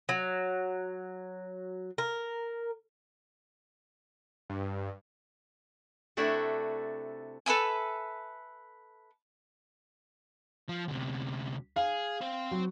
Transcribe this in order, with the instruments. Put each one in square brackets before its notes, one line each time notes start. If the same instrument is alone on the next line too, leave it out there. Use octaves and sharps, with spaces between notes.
[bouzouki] F#3
A#4
[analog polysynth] G2
[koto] C3 A3 D4 E4 F#4 A4
[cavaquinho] A4 B4 E5 G#5
[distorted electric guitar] F3
D2 C3
[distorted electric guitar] G#4 [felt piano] F5
[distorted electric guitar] C4 C5
[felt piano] F#3